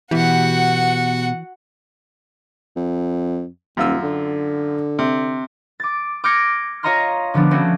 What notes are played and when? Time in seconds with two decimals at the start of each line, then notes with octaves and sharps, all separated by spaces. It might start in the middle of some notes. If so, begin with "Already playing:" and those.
0.11 B2 E3 B3 F#4 G4 F#5
2.76 F2
3.77 D#1 F#2 F4 E6
4.03 D3
4.99 C3
5.80 D6 A6
6.24 D6 F6 G6 G#6 A#6 C#7
6.83 F4 C#5 D#5 A#5 C6 F6
7.34 D3 F3 B3 D4
7.51 G#3 A3 C4 C#4 F#4